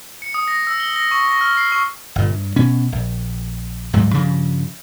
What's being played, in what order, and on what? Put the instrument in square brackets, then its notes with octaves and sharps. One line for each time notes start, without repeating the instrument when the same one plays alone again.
[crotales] C#7
D#6
A#6
E6
G7
A#6
C#6
A#6
F6
C7
C#6
[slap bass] G1 A#2
G2
B2 C#4
A#1
D1 G#2 F#3 G3
G2 C#3 F3